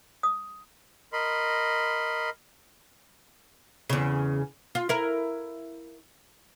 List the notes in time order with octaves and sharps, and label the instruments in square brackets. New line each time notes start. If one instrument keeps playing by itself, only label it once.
[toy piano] D#6
[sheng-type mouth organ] A#4 D#5 B5 C6
[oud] E2 C#3
F4
E4 A#4